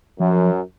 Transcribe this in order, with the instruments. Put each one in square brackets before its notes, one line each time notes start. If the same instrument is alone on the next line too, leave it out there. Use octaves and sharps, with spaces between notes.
[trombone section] F#2 [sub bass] F3